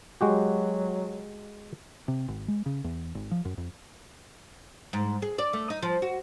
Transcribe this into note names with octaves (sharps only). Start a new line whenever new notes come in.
F#3 G#3 F#4 G4
C3
G#1
G#3
C#3
E2
G#1
F3
F#2
F2
G#2
G#4
D5
A3
D#4
F3
F#4